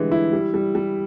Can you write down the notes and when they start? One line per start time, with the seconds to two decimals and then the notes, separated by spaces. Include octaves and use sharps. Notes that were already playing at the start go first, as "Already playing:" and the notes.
Already playing: D3 E3 G3 G#3
0.12 E4
0.33 G3
0.54 G3
0.75 G3